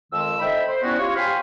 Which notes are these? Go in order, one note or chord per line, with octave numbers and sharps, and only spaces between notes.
F2 D#3 G#3 E6
D#4 A4 C5 E5 G5 B5
C5
G3 B3 C#4 E4 F#4
F4 G4 C#5
C5 F5 G5 G#5 B5 C6